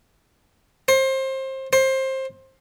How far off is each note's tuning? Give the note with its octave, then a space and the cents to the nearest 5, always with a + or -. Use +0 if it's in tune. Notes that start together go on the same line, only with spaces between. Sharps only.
C5 +25
C5 +20